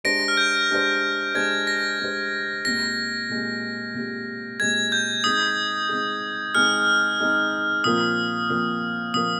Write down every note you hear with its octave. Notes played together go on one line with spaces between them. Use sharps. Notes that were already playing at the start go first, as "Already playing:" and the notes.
G#3 D4 G4 C5 A#6 D7
F6
G6
G#3 D4 G4 C5
G#3 D4 G4 C5 G#6
A#6
G#3 D4 G4 C5
A#2 G#3 C4 G4 A#6
A#2 G#3 C4 G4
A#2 G#3 C4 G4
A#2 G#3 C4 G4 G#6
G6
G#3 C4 D#4 G#4 D#6
G#3 C4 D#4 G#4
G#3 C4 D#4 G#4 F6
G#3 C4 D#4 G#4
A#2 F3 C4 F4 A#4 D#6
A#2 F3 C4 F4 A#4
A#2 F3 C4 F4 A#4 D#6